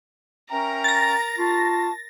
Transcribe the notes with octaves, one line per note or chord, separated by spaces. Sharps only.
C#4 A#4 E5 G5 A#5
A6 A#6
F4 A5 C#6